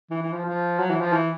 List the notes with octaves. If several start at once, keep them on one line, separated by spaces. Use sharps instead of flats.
E3
E3
F3
F3
F#3
E3
F3
E3